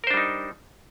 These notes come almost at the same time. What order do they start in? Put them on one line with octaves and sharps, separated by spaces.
A#4 C5 D4 G3 D#4